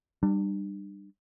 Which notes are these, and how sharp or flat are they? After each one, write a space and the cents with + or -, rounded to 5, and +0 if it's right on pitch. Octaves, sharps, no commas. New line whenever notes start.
G3 +0 D4 +40